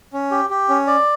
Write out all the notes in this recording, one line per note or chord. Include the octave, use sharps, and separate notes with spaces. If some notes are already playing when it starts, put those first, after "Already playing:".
C#4
G4
G4
C#4
D5